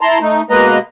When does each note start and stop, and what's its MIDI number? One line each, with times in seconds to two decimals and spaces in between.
0.01 0.19 64
0.01 0.19 81
0.01 0.19 82
0.01 0.19 84
0.21 0.42 57
0.21 0.42 63
0.50 0.79 47
0.50 0.79 56
0.50 0.79 58
0.50 0.79 71
0.50 0.79 75
0.50 0.79 82